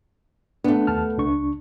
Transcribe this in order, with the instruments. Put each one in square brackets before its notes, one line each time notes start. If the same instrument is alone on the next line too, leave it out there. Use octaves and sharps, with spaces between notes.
[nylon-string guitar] A3 B3 [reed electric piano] D4
[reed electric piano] D#2 A5 F6
C#2 D4 C#6